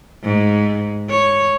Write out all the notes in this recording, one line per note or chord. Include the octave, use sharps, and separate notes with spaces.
G#2
C#5